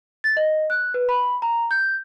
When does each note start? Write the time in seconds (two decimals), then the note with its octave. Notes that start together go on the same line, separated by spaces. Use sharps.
0.24 A6
0.37 D#5
0.70 F#6
0.94 B4
1.09 B5
1.42 A#5
1.71 G6